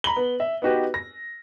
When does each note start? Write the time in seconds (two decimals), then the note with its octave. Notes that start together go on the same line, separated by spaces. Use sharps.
0.04 A#5 B5 F#7 G7
0.16 B3
0.40 E5
0.62 B3 D#4 F#4 G4 B4
0.94 A#6